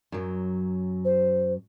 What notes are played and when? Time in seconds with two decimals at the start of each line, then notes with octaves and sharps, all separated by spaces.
0.12 F#2 F#3
1.05 C5